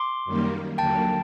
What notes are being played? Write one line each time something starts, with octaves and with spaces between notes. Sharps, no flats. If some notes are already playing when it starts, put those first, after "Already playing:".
Already playing: C6 D6
F#2 D#3 G3 A#3
D#2 D3 F#3 A#3 G5 A5